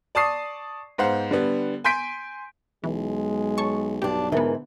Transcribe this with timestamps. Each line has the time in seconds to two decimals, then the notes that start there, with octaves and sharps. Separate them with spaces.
0.15 D5 A5 C#6 D#6 C7
0.98 G#2 B3 C5 F5 F#5
1.31 D3 G3 B3
1.84 G#5 C6 G6 B6 D7
2.84 B1 E3 G#3
3.58 C#5 A5 C#6
4.02 B1 G2 D4 G4
4.32 G#2 D3 E3 B3 A#4